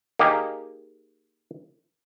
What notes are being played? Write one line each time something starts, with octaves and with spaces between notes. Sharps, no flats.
A#3 D#4 G4 G#4